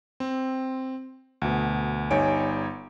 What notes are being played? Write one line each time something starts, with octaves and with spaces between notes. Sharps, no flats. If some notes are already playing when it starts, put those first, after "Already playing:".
C4
D2 B2
G1 G3 D#4 C#5 G#5 D7